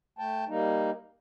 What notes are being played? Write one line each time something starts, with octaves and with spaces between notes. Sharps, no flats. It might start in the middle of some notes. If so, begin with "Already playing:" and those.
A3 G5 A5
G3 A#3 D#4